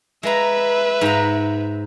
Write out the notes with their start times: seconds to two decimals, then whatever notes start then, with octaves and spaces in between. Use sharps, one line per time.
0.23 G#3 B4 E5 A#5
1.01 G#2 A#5